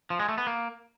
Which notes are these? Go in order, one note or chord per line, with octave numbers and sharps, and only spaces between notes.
F3
G#3
A3
B3
A#3